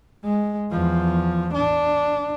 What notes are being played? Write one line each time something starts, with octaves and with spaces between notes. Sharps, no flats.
G#3
E2 F3
D4